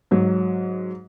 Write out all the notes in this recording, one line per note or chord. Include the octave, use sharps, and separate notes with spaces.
G#2 F#3